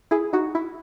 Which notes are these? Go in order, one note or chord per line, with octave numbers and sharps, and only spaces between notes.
E4 G#4
D#4 F#4
E4